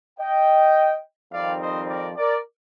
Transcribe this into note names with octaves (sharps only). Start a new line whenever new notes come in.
D#5 G5
F2 D#3 G3 C4 D#4 D5 F5
C5 D#5
A#4 D5
A#4 D5